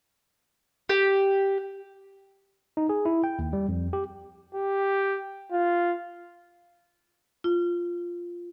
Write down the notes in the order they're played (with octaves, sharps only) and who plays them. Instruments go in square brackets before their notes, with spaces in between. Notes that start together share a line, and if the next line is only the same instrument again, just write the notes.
[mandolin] G4
[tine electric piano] D#4
G#4
E4
G5
D#2
G3
F2
G4
[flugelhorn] G4
F4
[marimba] F4